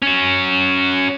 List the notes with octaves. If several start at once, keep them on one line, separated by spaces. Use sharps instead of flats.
C#4 F#4